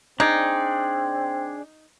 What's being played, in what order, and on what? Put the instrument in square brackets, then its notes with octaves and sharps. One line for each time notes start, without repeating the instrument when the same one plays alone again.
[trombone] C4 [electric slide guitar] D4 G#4 D5 [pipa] D#4